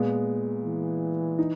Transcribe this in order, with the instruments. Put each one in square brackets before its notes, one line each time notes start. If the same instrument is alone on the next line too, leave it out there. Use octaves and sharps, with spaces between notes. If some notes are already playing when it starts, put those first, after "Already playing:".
Already playing: [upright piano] A#2 G#3 B3
[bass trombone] E3
[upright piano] D#4